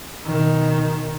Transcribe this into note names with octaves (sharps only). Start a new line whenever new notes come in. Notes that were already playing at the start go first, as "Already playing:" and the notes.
B2 D#3